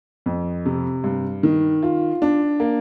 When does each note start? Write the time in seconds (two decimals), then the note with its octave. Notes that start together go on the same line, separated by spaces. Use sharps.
0.26 F2
0.66 C3
1.04 G2
1.43 D#3
1.83 F4
2.22 D4
2.60 A#3